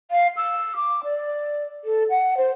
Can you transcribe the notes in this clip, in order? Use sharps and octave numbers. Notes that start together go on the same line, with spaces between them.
F5
E6
D6
D5
A4
F#5
C5